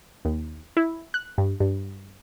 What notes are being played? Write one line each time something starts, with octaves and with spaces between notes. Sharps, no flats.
D#2
E4
F#6
G2
G2